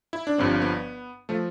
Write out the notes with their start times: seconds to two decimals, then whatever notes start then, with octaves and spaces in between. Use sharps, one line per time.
0.13 E4
0.27 D4
0.38 G1 G2 F3 C4
0.62 B3
1.29 F3 A3